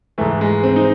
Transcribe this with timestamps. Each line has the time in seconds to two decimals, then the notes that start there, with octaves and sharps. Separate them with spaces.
0.18 E3 A3
0.21 G#2
0.41 G#3
0.63 C4
0.76 D#4